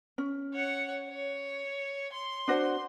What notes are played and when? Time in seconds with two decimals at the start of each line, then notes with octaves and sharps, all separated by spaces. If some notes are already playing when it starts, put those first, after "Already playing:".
0.18 C#4
0.54 C#5 F#5
1.09 C#5
2.13 C6
2.48 D4 F#4 C5